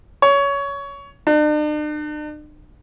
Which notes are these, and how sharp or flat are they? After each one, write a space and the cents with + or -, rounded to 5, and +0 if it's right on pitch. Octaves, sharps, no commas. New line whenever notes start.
C#5 +20
D4 +45